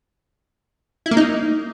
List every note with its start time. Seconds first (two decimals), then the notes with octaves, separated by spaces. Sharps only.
1.06 E4
1.11 A#3
1.17 D#4